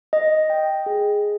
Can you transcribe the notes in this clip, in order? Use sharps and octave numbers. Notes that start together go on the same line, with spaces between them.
D#5
G5
G#4